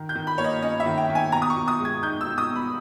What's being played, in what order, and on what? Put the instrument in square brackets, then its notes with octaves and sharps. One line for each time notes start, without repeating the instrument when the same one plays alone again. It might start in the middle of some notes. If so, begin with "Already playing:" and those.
Already playing: [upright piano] D#3
G6
D#3
B5
A#3 C#5
D#5
C#4 D#5
E5
D#3
G5
D#3
G#5
B2 A#5
D#6
C#6
B2
D#6
G#3
G#6
D#4 G6
E6
B2
D#6
B2
B5